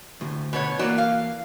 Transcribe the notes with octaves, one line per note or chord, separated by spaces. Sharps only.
D2 A2
B2 B3 C#5
E3 A3 A#3 F#4 D5
F5